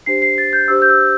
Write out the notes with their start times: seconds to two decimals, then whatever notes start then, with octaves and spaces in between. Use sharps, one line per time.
0.06 D4 G4 C5 C7
0.22 C7
0.38 A6
0.53 G6
0.68 D4 G4 C5 E6
0.82 G6
0.89 E6